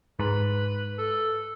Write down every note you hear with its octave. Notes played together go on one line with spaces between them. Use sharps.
G#2 B4
A4